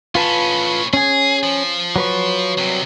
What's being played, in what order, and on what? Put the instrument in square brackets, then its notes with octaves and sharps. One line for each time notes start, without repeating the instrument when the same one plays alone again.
[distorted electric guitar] A2 C#4 [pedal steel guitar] F4 B4 A5
[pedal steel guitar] C#4 G#5 [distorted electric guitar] G#4
[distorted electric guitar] F3
[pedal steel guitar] F#3 B4 C#5
[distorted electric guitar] C2 C3